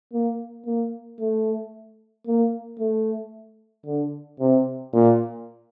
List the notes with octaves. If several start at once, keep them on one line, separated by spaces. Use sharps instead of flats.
A#3
A#3
A3
A#3
A3
D3
C3
A#2